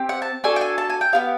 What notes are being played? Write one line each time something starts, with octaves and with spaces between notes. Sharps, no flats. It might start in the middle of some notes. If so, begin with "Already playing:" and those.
Already playing: C4 G4
F#5
A5
D4 F#4 A4 G#5
G5
G#5
A5
G#5
G5
B3 E4 G4 F5